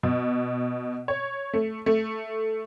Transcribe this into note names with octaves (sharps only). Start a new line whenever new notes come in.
B2
C#5
A3
A3